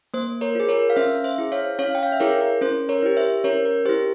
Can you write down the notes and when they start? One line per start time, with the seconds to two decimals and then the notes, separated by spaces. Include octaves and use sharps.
0.14 A#3 C5
0.41 A#4 C#5
0.55 F4 G#4
0.69 A#4 C#5
0.90 F5
0.96 C#4 C5 E5
1.24 C5 E5
1.38 E4 G#4
1.52 C#5 F5
1.79 C#4 C#5 F5
1.95 G5
2.03 F5
2.12 E5
2.20 E4 G#4 A#4 C#5
2.41 A#4
2.61 C#4 C5
2.89 A#4 C#5
3.03 E4 G4
3.17 C5 E5
3.44 C#4 A#4 C#5
3.65 A#4
3.85 E4 G4 C5